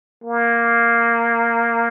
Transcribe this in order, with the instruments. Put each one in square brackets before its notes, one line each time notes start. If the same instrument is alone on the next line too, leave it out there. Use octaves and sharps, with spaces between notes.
[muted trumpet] A#3